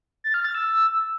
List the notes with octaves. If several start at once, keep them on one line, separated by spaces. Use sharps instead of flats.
A6
F6
A6
E6